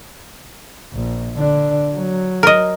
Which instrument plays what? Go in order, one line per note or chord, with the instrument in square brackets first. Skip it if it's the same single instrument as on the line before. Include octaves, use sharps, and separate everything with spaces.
[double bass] A#1
D3 D4
F#3
[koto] A#4 D#5